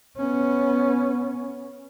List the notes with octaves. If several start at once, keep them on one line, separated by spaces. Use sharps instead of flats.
B3 C#4